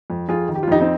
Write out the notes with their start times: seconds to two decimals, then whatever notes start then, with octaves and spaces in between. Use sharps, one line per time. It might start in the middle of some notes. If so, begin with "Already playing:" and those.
0.10 F2
0.29 F2 F4 G#4
0.49 D#3
0.55 G4
0.63 F4
0.68 F2 D#4 G4
0.81 C4 D#4